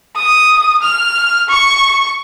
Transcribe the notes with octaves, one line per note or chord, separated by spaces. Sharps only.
D#6
F6
C#6